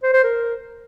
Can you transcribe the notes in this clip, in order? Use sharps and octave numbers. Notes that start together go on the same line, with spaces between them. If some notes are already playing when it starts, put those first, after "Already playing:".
C5
C5
A#4